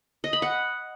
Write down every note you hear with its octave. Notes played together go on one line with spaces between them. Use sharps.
D#5
B5
F#5